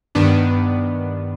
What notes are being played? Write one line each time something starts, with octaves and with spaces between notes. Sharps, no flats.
G2 D#3 B3 D4